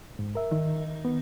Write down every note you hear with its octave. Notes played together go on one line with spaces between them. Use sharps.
G#2
A#4 E5
D#3
B3